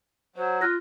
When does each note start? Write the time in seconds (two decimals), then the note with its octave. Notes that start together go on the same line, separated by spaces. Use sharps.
0.36 F#3 C5
0.61 F4 F6 F#6 A#6